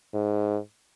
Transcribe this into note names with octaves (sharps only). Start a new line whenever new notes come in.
G#2